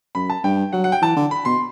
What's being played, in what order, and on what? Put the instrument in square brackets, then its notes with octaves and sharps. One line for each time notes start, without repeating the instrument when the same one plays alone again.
[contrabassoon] F#2 [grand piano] B5
[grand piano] A5
[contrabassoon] G2 [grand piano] G5
[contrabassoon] F#3 [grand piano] F#5
[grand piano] F#5
G5
[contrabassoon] E3 [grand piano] A5
[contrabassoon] D3
[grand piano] B5
[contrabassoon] B2 [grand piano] C6